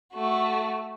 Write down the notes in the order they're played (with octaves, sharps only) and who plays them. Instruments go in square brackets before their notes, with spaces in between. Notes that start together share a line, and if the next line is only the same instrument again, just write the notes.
[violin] A3 F#4